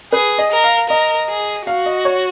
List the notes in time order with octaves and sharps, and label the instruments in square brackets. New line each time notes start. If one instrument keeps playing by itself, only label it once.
[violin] G#4 [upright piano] B4
[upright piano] D#5
[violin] A#4
[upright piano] F5
[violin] A#4 [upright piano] D#5
[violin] G#4
[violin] F#4 [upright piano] F5
[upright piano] D#5
C#5